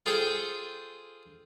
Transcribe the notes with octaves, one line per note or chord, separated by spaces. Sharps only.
F4 G#4 A4 C5 G5